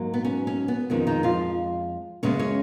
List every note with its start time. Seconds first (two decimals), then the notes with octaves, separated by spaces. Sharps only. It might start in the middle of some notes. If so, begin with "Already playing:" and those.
Already playing: G#2 F#3 A#3
0.14 B3
0.25 C#4
0.47 C#4
0.68 B3
0.90 F2 D#3 G#3 C#4
1.07 D#3 D#4
1.23 F3 F4
2.23 F#2 C#3 G#3 B3 C#4 C#5
2.39 C#4 C#5